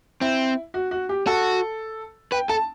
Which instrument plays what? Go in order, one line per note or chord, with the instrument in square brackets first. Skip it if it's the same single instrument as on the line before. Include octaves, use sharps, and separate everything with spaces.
[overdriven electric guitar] C4 [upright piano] E4
[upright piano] F#4
F#4
G4
[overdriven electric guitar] F#4 [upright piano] A4
[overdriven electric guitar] B4 [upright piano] G5
[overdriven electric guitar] A4 [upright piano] A5